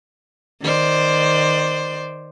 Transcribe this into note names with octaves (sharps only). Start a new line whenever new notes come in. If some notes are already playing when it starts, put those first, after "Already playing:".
D#3 C5 D5